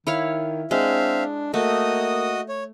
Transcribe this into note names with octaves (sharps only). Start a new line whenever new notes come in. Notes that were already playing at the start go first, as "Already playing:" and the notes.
D#3 E4 C#5 F5
G#3 C4 D4 E5 F5
A3 A#3 F#4 D#5 D#6
C#5